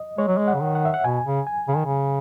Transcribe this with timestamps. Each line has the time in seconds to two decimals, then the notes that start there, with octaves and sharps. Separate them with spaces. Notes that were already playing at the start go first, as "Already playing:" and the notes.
Already playing: D#5
0.18 G#3 C#5
0.28 F#3
0.37 G#3
0.48 F#5
0.55 C#3
0.61 D#3
0.75 F#5
0.85 E5
0.94 F#5
1.04 B2 G#5
1.26 C#3
1.47 G#5
1.68 C#3
1.77 D#3
1.85 C#3